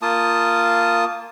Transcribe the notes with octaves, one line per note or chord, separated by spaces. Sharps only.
A#3 F4 A5 D#6